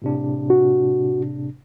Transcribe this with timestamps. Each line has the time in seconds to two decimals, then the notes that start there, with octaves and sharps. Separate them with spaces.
0.02 A2 C3 D4
0.50 F#4